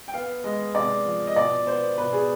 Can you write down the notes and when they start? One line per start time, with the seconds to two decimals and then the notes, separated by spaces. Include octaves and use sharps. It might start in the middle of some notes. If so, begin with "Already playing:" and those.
0.08 G5
0.14 B3 F5
0.44 G#3 D#5
0.75 C3 D5
1.05 F3
1.27 D#5
1.36 B2 D5
1.67 B3 C5
1.98 B2 B4
2.13 G#4